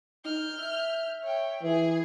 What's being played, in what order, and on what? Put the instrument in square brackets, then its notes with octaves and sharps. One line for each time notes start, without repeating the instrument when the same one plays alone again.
[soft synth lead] D#4 [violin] F6 G6
[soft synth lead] E5
[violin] C#5 G5
[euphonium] E3 [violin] G#4 G#5